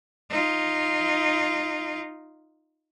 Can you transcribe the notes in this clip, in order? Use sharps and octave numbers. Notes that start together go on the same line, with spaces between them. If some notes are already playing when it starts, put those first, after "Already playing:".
D#4 F4